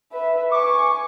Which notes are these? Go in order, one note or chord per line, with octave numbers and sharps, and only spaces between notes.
B4 E5
G#5 C#6 D6